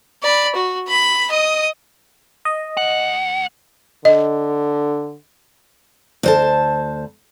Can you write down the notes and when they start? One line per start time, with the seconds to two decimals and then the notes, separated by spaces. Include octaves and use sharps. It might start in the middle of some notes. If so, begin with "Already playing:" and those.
0.23 D5 B5
0.55 F#4
0.88 B5 B6
1.30 D#5 D#6
2.45 D#5
2.77 D2 F#5
4.05 D3 D#5
6.23 D2 C5 A5